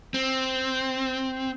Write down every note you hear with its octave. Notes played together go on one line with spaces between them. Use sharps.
C4